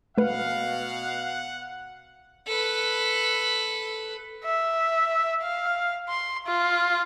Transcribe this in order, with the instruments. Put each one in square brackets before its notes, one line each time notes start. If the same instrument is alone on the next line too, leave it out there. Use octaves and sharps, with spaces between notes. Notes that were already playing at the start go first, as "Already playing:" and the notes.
[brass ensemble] B2 F5 [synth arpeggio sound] A3 B4 [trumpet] F#5
[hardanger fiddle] A4 B4
[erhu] E5
F5
C6
F4